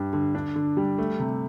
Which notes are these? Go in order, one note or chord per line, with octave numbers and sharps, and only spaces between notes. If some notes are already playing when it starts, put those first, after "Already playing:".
Already playing: G2 G3
D3
D4
D3
G3
A3
C3